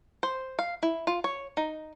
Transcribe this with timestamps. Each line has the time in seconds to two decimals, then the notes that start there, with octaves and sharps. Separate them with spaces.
0.23 C5
0.59 F5
0.83 E4
1.07 F4
1.24 C#5
1.57 D#4